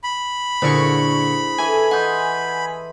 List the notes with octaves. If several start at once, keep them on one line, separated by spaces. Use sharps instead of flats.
B5
A#2 D3 D4 E4 G#4 C5 C#6
E3 A4 G#5
E3 D#5 F#5 C6 G6